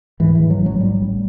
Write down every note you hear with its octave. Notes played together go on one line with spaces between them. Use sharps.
G#2 E3
G#2 E3
F#3
A1
F#3
G#2 G3
A1